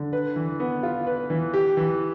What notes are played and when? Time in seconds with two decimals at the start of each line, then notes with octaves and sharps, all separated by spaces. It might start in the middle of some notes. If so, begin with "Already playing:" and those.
Already playing: D3
0.13 B4
0.36 E3
0.60 B3
0.83 F4
1.07 B4
1.30 E3
1.54 G4
1.77 E3